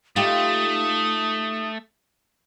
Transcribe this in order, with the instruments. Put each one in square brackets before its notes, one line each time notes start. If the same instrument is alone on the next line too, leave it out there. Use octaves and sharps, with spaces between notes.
[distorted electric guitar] A3 [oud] D#4 F4 G4 [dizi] D#6